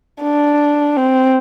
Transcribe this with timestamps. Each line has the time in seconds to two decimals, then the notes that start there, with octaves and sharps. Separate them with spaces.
0.22 D4
0.97 C4